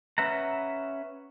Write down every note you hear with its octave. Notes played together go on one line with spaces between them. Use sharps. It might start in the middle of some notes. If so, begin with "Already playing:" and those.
C#4 B4 E5 F#5 A#5